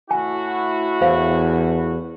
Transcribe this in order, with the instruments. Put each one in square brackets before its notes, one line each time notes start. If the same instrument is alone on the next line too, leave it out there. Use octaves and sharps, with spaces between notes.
[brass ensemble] A2 E4 F#4 [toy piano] G#5
[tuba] E2 [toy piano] C5 F5